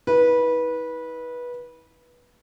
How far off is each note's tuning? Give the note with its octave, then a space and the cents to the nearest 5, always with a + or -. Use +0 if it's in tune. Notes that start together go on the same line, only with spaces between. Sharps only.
E4 -45 B4 -20